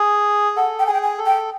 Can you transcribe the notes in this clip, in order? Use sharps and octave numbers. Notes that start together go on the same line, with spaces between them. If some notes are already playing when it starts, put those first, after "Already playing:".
Already playing: G#4
A4 F#5
G5
G#4 G#5
G5
G#5
A4
G5